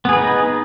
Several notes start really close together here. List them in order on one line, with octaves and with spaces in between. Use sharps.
B3 G#4 B4 D#4